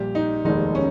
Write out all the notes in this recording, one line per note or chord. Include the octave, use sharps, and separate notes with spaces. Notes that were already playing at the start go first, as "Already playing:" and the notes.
Already playing: A#1 A#2 G3 G4
D#4
F1 D#2 D#3 G#3 D#4
C#4